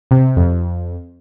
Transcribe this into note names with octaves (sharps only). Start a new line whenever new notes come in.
C3
F2